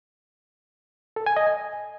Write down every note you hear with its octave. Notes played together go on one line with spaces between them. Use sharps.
A4
G#5
D#5
G#5